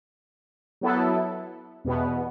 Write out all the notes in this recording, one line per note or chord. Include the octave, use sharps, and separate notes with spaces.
F#3 B3 E4 A4
E2 B2 B3